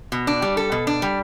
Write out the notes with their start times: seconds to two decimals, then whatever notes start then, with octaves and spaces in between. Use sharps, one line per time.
0.12 B2
0.27 D4
0.42 G3
0.57 A4
0.72 B2
0.87 D4
1.02 G3